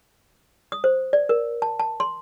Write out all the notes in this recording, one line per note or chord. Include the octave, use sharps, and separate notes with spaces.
D#6
C5
D5
A#4
A5
A5
C6